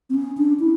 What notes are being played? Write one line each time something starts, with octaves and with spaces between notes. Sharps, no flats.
C4
C#4
D4
E4